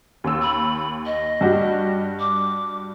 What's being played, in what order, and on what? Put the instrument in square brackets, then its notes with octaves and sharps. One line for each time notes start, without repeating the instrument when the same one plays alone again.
[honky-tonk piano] D#2 E6
[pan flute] B5
D#5
[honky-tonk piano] G2 F#4 G4
[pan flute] D6